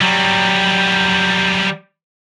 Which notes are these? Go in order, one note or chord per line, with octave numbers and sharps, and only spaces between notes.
F#3 G3